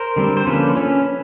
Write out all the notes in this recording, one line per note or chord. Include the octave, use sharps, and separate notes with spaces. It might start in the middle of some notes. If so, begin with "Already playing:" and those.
Already playing: A#4 C5
D3 G3 C4
C5
D3 F3 A#3 C#4 A4 B4
C#4